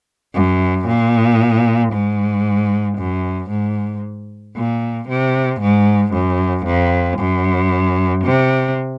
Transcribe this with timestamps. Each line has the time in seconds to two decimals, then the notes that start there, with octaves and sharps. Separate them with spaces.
0.34 F#2
0.87 A#2
1.93 G#2
2.98 F#2
3.50 G#2
4.56 A#2
5.09 C3
5.61 G#2
6.13 F#2
6.66 F2
7.19 F#2
8.24 C3